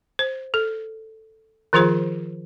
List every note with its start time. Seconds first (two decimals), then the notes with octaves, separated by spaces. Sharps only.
0.19 C5
0.54 A4
1.73 D#3 F3 F4 G#4 C5